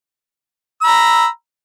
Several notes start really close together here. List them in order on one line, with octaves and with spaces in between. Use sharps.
E6 B5 A#5